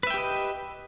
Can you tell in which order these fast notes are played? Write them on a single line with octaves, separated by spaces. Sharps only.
B4 E5 G5 G4 D#5